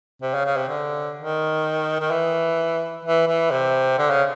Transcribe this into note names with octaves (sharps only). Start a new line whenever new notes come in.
C3
C#3
C#3
C3
D3
D#3
D#3
E3
E3
E3
C3
D3
C#3